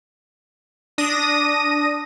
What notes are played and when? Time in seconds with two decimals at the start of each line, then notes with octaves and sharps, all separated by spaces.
0.98 D4 D#6 A#6 D#7